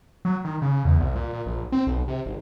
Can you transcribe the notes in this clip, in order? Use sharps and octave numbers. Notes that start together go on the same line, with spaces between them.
F#3
D#3
C#3
E2
C2
A#2
A#2
A#1
C4
B1
C3
G#1